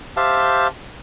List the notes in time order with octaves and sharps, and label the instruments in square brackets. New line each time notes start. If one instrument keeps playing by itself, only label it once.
[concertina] G4 C5 E5 F5 A5